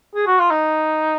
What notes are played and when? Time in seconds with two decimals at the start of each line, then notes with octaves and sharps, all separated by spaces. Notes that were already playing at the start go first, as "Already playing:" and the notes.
0.15 G#4
0.26 F#4
0.39 F4
0.51 D#4